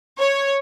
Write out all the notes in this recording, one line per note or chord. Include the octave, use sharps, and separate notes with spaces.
C#5